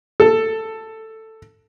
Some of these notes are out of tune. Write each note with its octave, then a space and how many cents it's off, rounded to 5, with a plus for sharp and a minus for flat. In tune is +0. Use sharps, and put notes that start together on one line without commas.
A4 +10